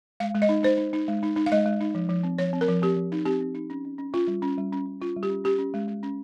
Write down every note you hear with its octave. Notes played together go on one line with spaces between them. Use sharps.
G#3 F5
G#3
D#5
D#4
D#4 C5
D#4
D#4
G#3
D#4
D#4
F5
G#3 D#5
G#3
D#4
F3
F3
C4
F3 C#5
C4
A#4
F3
C4 G4
F3
D#4
C4 G4
C4
D#4
C#4
C#4
C#4
C#4 F4
G3
C#4
G3
C#4
C#4
C#4 F4
G3
G4
C#4
C#4 G4
C#4
G#3
G#3
C#4